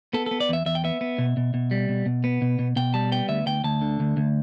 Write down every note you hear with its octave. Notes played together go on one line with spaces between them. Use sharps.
B3 A4
B3 A4
D5
E2 E5
E2 E5
G5
B3 E5
B3
B2
B2
B2
G3
B2
B2
B3
B2
B2
B2 G5
G3 A5
B3 G5
D2 E5
D2 G5
D2 A5
D3
D2
D2